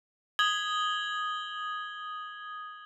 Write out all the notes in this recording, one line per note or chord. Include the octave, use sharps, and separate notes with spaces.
D#6 G#6 F#7 G7